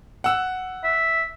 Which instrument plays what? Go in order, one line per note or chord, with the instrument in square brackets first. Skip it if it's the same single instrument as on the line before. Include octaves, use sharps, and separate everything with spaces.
[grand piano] F#5 E6
[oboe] E5